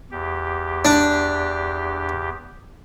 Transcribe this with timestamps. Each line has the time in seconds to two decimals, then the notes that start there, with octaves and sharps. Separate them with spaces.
0.11 E2 G4
0.85 D4